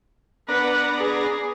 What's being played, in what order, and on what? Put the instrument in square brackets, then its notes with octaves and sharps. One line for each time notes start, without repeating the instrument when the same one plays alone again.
[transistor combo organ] B3 D4 A#5 [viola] B4 F#5
[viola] G#4